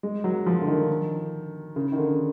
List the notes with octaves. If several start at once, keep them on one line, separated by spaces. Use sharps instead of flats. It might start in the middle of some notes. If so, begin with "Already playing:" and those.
G#3
F#3
F3
D3
D#3
C#3
D#3
D3